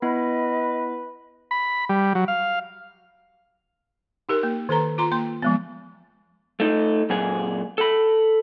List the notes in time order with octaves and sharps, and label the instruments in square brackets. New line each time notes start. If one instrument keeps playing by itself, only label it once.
[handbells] B3 E4 [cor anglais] B4 [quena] D#5
[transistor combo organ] B5
G3
F#3
F5
[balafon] D#4 G4 A#4
A#3
D#3 A4 B4 A#5
F4 A#5 C6
A#3 C6
F3 G#3 B3
[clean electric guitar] A3 D#4
F#2 A#2 G#4
A4 B5